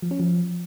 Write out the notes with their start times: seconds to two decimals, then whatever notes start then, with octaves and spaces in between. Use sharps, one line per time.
0.02 F3
0.11 C#4
0.19 F3